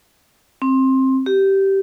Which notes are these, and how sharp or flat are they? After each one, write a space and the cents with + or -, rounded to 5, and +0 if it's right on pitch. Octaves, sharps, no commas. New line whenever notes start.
C4 +15
G4 -15